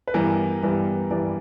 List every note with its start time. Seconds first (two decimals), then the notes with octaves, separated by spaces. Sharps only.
0.08 B4
0.14 G2 E3 G3 B3 A#4
0.63 G2 E3 G3 B3
1.11 G2 E3 G3 B3 D5